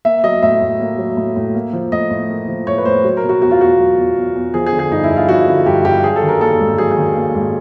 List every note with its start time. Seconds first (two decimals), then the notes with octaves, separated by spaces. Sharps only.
0.05 A#3 E5
0.24 F#3 D#5
0.43 A2 E5
0.62 A2
0.80 A#3
0.98 F#3
1.17 A2
1.36 A2
1.55 A#3
1.73 F3
1.92 A2 D#5
2.11 A2
2.30 A#3
2.48 F3
2.67 A2 C#5
2.78 B4
2.85 A2 C5
3.04 F#3
3.17 A#4
3.23 B2
3.29 F#4
3.42 E2 F#4
3.51 F4
3.60 E2 F#4
3.79 F#3
3.98 B2
4.17 E2
4.35 E2
4.54 F3 G#4
4.66 G#4
4.73 D3
4.79 G#4
4.91 G2 D#4
5.04 E4
5.10 G2
5.16 F4
5.29 F3 F#4
5.47 D3
5.66 G2 G4
5.85 G2 G4
6.03 F#3 G#4
6.16 A4
6.22 D#3
6.28 A#4
6.41 A#3 A4
6.60 G#2
6.78 F#3 G#4
6.91 G#4
6.97 D#3
7.16 A#3
7.35 G#2